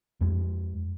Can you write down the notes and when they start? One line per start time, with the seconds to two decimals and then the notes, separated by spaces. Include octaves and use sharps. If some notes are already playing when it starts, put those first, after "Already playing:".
0.21 F2 G#3